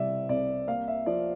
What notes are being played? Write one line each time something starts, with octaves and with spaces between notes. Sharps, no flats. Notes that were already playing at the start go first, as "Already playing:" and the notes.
Already playing: C3 E3 G3 D5 E5
C2 D5
A#3 F5
E5
F3 D5